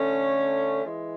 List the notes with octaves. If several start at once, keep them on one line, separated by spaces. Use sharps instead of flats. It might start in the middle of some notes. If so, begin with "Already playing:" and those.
Already playing: D3 A3 C#4
E3 G#3